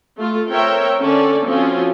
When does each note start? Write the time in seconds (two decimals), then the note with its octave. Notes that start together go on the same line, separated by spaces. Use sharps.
0.17 A3 F4
0.49 C4 A#4 C#5 E5 G5
1.00 D3 C#4 A4 D5
1.46 F3 C4 C#4 F4 F#4